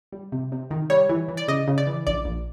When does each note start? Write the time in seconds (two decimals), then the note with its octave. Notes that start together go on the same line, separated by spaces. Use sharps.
0.12 G3
0.32 C3
0.52 C3
0.71 D#3
0.90 G3 C#5
1.09 E3
1.28 E3
1.37 D5
1.48 C#3 D#5
1.68 C#3
1.78 D5
1.87 E3
2.07 A#1 D5
2.25 A#1